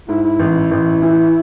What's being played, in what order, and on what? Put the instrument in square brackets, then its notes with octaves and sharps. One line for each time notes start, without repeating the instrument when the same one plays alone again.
[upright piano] G#2 [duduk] E4
[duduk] E4
[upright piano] A1
A1
E3